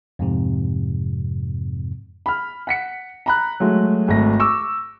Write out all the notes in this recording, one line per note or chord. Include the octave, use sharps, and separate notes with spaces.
F2 G#2 C3
B5 F6
F#5 B6 C#7
A#5 B5 F#6
F#3 G#3 A3
G#1 A3 A#6
C#6 D6 E6